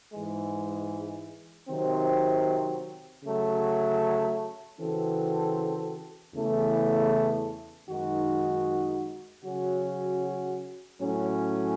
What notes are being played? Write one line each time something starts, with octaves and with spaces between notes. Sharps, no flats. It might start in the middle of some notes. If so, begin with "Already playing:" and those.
G#2 E3 G#3
C3 D#3 F#3 C4
C#3 F#3 A3
C#3 E3 C4 F#4 A4
E2 C#3 E3 A3
F#2 D#3 G#3 D#4 F#4
C#3 F#3 C#4 F#4
A2 F#3 C#4